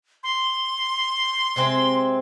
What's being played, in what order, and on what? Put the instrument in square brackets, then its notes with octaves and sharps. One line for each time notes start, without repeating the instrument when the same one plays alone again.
[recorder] C6
[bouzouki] C3 G#3 C4